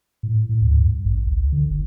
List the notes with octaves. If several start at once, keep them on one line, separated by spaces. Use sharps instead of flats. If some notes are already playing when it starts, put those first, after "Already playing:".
A2
A2
D2
G2
A1
C#2
D3
G1